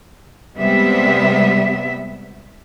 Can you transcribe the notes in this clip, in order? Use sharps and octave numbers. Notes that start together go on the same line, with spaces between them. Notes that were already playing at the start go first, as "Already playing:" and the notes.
C3 G3 G#3 B3 E5